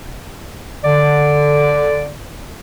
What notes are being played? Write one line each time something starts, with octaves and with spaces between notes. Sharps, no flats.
D3 D5